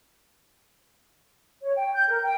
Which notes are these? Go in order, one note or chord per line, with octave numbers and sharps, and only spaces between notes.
C#5
G5
G6
A#4
G5